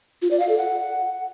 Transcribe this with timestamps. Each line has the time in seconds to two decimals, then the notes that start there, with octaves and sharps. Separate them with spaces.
0.22 F4
0.31 D5
0.40 F5
0.49 A4
0.57 F#5